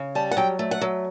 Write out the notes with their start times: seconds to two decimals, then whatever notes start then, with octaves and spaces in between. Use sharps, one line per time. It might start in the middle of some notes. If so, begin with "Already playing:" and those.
Already playing: C#3
0.15 G3 A5
0.31 F#5
0.37 F#3 G5
0.59 A3
0.71 F#5
0.81 F#3